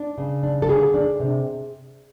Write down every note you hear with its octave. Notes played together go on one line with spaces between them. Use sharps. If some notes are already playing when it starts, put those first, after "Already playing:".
Already playing: D4
C#3
D4
A4
D3 G#4
D4
C3